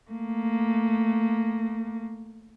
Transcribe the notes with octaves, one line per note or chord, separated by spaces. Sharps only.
A3 A#3